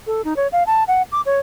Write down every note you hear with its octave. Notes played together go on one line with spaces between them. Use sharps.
A4
D#4
C#5
F5
A5
F#5
D6
C#5